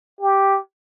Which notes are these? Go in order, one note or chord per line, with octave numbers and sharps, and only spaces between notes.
G4